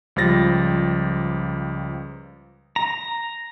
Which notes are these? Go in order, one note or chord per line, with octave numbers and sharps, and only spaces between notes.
C#2 F3 G3 C5 A6 A#6
A#5